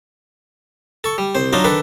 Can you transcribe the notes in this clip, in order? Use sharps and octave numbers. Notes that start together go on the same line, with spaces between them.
A4 C#6
G3
C2 C5
F#3 D4 D#4 F4
D#3 D4 A4 B4